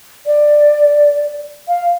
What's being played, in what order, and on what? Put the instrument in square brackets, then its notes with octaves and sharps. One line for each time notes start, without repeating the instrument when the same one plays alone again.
[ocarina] D5
F5